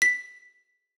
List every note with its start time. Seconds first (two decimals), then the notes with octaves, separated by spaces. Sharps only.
0.02 B6